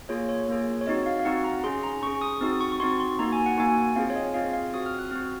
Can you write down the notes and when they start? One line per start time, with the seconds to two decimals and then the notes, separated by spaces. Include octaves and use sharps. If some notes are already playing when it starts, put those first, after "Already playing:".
0.09 A#3 F4 G#4 C#5
0.29 C#5
0.49 A#3 F4 G#4
0.81 C#5
0.87 C4 D#4 F#4 D#5
1.06 F5
1.19 F5
1.25 C4 D#4 F#4 F#5
1.44 A#5
1.64 C#4 G#4 C6
1.83 A#5
2.02 C#4 G#4 C#6
2.21 D#6
2.41 C4 D#4 F#4 D#6
2.52 D#6
2.61 C#6
2.72 C#6
2.80 C4 D#4 F#4 C6
3.00 C6
3.19 A#3 D#4 F#4 A#5
3.32 G#5
3.46 F#5
3.58 A#3 D#4 F#4 G#5
3.96 C4 F4 G#4 F5
4.10 C#5
4.16 D#5
4.34 C4 F4 G#4 F5
4.53 F5
4.73 C4 F#4 D#6
4.86 F6
4.99 F#6
5.11 C4 F#4 F6